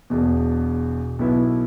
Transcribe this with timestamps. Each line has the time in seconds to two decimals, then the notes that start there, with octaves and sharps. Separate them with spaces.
0.10 E1 E2 B2
1.19 B1 B2 B3 E4